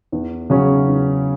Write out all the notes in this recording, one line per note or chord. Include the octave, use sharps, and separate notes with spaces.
E2
C#3 F#3 C#4
E2